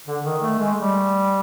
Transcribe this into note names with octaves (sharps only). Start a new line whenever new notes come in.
D3
D#3
A3
G#3
G3